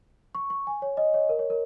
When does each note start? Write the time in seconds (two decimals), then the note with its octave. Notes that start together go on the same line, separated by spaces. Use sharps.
0.35 C#6
0.50 C#6
0.67 G#5
0.82 C#5
0.97 D#5
1.14 C#5
1.29 A#4
1.39 C#5
1.50 A#4